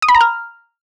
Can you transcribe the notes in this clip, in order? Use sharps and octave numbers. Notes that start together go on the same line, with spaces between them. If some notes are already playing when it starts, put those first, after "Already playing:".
D#6
B5
A#5
F6